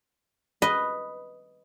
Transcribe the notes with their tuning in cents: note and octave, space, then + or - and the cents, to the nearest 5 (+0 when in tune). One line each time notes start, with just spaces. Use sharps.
B4 +0 D#5 +0